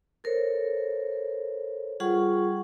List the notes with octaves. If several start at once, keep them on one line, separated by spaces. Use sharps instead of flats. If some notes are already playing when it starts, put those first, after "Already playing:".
A4 A#4 C5 C#5
G3 F4 G#4 F#5 C#6